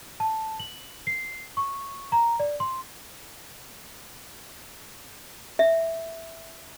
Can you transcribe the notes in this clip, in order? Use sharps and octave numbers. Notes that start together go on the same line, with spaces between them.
A5
F#7
C7
C#6
A#5
D5
C6
E5